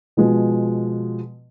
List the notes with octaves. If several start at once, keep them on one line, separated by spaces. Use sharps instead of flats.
B2 F3 G#3